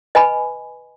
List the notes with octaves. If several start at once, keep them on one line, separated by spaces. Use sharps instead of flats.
B4 D#5 G#5 B5